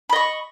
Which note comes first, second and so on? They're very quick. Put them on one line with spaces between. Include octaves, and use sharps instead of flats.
B5 D#5 C#6